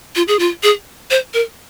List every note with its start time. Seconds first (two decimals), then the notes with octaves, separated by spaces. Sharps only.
0.16 F4
0.28 G#4
0.39 F4
0.63 G#4
1.11 C5
1.34 A#4